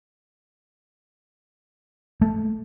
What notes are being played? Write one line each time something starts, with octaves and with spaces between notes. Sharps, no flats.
A3